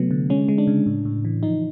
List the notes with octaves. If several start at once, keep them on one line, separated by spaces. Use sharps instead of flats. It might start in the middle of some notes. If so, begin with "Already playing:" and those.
Already playing: C3 F#3 A3 B3
D3
G#3 C#4
G#3
D4
C#3
A2
A2
E3
F3 D#4